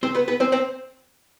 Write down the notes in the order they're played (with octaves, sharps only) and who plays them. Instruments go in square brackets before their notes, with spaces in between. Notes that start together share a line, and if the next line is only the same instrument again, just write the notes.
[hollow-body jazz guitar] C4 C5
B3 B4
B3 B4
C4 C5
C4 C5